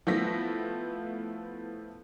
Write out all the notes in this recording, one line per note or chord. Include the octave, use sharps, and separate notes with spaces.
F3 A3 B3 E4 A#6 B6